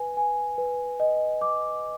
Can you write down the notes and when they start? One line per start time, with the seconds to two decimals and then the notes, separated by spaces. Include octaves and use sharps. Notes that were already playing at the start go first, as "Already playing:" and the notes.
Already playing: B4 G#5
0.17 G#5
0.58 B4
1.00 D#5
1.41 D6